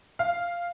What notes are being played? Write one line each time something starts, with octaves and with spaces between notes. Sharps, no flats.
F5